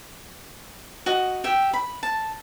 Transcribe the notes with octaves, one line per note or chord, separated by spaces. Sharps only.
F#4 D#5
G4 E5 G5
B5
A5